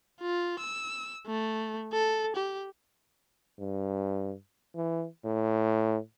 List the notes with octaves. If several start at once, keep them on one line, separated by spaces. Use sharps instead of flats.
F4
E6
A3
A4
G4
G2
E3
A2